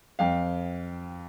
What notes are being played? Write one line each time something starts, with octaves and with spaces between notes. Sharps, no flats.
F2 F5 G5